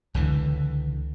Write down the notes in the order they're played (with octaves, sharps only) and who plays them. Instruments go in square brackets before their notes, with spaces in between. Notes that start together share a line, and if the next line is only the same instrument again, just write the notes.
[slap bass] C#2 D3 E3